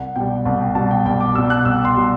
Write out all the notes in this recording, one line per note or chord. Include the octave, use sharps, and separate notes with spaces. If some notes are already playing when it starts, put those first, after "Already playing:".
Already playing: C2 F#5
B2 G3 G5
C2 A5
G5
B2 G3 A5
G5
C2 G5
D6
B2 G3 E6
F#6
C2 E6
C6
B2 G3